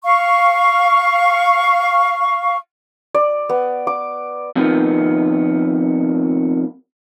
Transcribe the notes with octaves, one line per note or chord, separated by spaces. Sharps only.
F5 C#6
D5
B3
D6
F2 C3 D#3 F3 B3